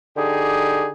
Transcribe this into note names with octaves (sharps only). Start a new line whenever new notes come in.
D3 D#4 G4 G#4